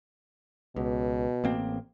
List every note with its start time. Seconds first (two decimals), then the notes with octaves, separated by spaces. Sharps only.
0.76 C#2 B2
1.44 A1 A#3 C4